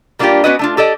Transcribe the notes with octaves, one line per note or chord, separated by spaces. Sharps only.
G3 A#3 D4 E4 F4 G4
B3 C#4 F#4 B4 D5 D#5
A3 D4 F4
G4 A4 D5 D#5